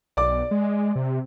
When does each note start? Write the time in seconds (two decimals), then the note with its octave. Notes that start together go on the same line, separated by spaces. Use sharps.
0.17 B1 D5 D6
0.51 G#3
0.96 C3